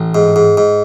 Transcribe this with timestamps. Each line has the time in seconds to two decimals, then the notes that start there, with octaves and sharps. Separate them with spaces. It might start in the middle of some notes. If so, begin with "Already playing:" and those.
Already playing: A1
0.15 G#2
0.36 G#2
0.57 G#2